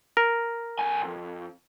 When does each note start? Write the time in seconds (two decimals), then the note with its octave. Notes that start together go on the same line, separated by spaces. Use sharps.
0.17 A#4
0.79 B1 G#5
1.05 F2